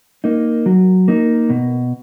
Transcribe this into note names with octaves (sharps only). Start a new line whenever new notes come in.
A#3 D#4
F#3
A#3 D#4
B2